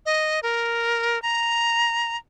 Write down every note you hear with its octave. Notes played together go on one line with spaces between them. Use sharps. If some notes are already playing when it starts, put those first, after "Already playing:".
D#5
A#4
A#5